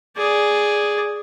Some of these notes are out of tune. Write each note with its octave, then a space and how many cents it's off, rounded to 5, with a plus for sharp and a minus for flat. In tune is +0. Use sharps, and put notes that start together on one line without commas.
G#4 +0 D5 -5